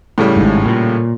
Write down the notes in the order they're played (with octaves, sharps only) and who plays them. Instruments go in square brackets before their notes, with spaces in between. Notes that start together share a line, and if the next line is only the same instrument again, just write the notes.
[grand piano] A2 C#3 G3
[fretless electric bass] G#1 G#2
A#2